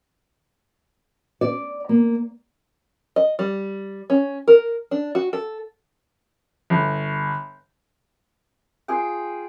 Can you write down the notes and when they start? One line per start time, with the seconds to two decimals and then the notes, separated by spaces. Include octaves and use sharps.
1.41 D5
1.89 A#3
3.16 D#5
3.39 G3
4.10 C#4
4.48 A#4
4.91 D4
5.15 F#4
5.33 A4
6.70 G1
8.88 F4 G#4 G5